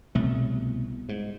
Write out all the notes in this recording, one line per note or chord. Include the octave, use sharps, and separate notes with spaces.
C2 B2 A3
G#2